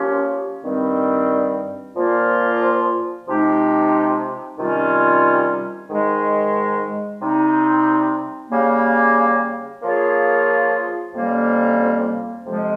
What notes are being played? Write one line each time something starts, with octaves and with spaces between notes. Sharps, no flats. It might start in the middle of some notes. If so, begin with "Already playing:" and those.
Already playing: F3 A#3 C#4 G4 C#5
G2 D#3 G3 C4
A#2 F3 A#3 F4
C3 F3 G#3 D#4 G4
C3 D#3 G3 C#4 F4
G#2 D#3 G#3
C3 G3 C4 D#4
C#3 G3 A#3
F3 A#3 F4 G#4 C#5
F2 C3 G3 A#3 C#4
F2 C3 F3 G#3